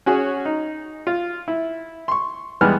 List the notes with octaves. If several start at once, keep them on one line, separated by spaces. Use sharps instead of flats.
C#4 F#4 G#4 C#5
D#4
F4
E4
C6 C#6
E2 G3 G#3 B3 F6